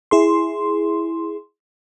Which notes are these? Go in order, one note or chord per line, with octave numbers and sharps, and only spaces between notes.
E4 G#4 C6